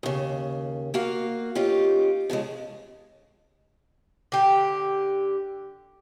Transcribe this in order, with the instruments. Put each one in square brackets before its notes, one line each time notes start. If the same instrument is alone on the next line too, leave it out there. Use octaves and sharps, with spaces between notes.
[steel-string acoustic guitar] D#2 C#3
A#3 F#4 F5
C#4 D#4 F4 G4
A2 C#3 F3 G#3
[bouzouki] D3 G4